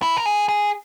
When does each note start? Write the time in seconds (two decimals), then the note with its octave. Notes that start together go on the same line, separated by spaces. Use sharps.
0.02 E4
0.17 A#4
0.26 G#4
0.49 G#4